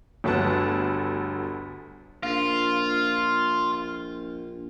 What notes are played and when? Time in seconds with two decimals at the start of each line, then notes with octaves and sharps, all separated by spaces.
0.24 G1 D2 B3 A5 F#6
2.23 A#1 F4